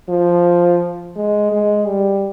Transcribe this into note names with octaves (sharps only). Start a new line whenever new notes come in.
F3
G#3
G#3
G3